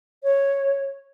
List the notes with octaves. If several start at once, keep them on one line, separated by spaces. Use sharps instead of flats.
C#5